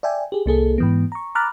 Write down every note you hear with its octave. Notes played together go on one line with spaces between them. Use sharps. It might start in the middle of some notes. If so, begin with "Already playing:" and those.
D5 E5 G5 G#5
G4 G#4
C2 A#3 G#4 A4
G#2 E3 B3
A#5 C#6
A#5 B5 D6 F6 F#6 A6